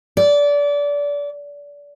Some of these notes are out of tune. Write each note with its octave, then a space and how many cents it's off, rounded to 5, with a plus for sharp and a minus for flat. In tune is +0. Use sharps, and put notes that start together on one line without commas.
D5 -25